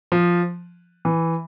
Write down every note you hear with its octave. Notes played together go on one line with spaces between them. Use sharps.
F3
E3